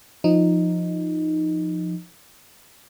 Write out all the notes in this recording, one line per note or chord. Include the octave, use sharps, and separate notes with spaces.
F3 D#4